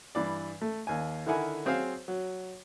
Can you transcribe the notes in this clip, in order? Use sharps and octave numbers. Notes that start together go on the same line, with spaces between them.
G2 E3 D5
A3
D#2 G#5
D3 D#3 E4 A#4 F#5 G#5
F#3 C4 G#4 C5 F5
F#3